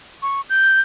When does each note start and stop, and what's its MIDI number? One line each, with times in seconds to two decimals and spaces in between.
0.22 0.41 85
0.50 0.81 91